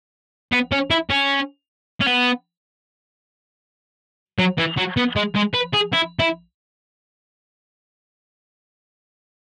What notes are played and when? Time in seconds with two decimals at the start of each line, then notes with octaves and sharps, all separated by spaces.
0.52 B3
0.72 C#4
0.90 E4
1.10 C#4
2.01 C#4
2.06 B3
4.39 F#3
4.58 E3
4.77 F#3
4.97 B3
5.16 G#3
5.35 G#3
5.54 B4
5.74 G#4
5.93 E4
6.19 E4